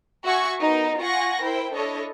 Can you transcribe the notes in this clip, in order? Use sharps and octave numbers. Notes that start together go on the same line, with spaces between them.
F#4 E5 G#5 C#6 G#6
B3 D#4 A#4
F4 F#5 G#5 C#6 A#6
E4 A#4 C5 G5
D4 E4 A4 C#5 D#5